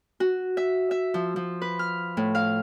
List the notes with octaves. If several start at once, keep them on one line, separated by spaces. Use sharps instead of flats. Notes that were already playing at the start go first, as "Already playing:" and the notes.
F#4
E5
E5
F3
F3
B4
F6
A2
F5